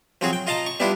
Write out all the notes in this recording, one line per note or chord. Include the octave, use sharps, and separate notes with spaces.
F3 F#3 C4 F#4 G#4
G5
F4 D#5 F5 A5 A#5
C#6
G3 B3 D4 E4 F4